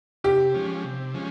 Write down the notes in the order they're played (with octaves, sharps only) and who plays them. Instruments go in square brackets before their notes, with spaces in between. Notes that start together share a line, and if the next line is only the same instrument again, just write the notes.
[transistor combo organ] C3 [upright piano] G4
[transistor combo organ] F3 G#3 C#4
C3
F3 G#3 C#4